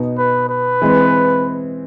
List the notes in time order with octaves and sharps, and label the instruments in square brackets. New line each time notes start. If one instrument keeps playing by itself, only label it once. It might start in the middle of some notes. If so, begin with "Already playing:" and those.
Already playing: [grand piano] B2 B3 D#4
[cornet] B4
B4
[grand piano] E3 G#3 C4